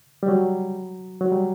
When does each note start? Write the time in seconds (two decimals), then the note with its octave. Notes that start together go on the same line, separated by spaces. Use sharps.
0.23 G3
0.29 F#3
1.21 F#3
1.32 G3